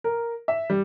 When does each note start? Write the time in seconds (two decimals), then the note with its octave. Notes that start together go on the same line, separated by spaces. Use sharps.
0.04 A#4
0.48 E5
0.70 G3